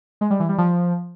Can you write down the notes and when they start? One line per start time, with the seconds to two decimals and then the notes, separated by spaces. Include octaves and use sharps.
0.21 G#3
0.30 G3
0.40 E3
0.49 G3
0.58 F3